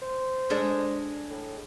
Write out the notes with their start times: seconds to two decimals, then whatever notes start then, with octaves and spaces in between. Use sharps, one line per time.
0.02 C5
0.50 G#3 D4 A4
1.30 A2